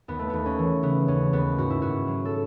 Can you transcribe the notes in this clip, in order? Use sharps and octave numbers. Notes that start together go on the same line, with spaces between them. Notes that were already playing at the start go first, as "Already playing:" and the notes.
D#2 B3
A3
D#2 B3
C#4
E3
C#3 B3
D#2 C#4
D#2 B3
G#2 F#4
E4
G#2 F#4
F#3
A4